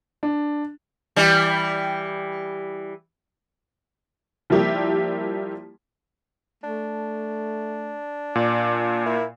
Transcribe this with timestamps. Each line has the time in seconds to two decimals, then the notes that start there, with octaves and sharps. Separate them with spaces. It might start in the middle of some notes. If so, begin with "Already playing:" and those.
0.23 D4
1.16 E3 G3
4.50 F3 G3 A#3 E4 G4
6.64 A3 D4
8.35 A#2 D5
9.06 E4 A#4